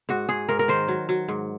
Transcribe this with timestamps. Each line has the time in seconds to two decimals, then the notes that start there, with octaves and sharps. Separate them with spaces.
0.09 G#2 F#4
0.29 G#2 G#4
0.49 G#2 A#4
0.59 A#4
0.68 D#3 C5
0.88 F#3
1.09 F#3
1.28 G#2